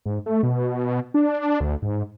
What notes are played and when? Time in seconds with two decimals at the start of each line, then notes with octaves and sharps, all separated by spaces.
0.06 G#2
0.26 A3
0.43 B2
1.14 D4
1.60 D2
1.82 G#2